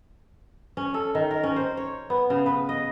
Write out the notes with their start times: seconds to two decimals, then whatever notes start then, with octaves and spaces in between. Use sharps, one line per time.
0.77 C#4
0.94 A4
1.15 D#3
1.31 A#4
1.43 C#4
1.56 C5
1.77 C#5
2.10 B3
2.30 C#3
2.46 B4
2.69 D#5